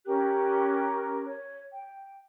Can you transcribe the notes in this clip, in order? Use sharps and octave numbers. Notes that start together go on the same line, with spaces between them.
C#4 G4 A#4 F#6
C#5
G5